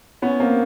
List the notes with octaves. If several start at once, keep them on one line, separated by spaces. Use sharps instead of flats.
B3 C#4
A#3 C4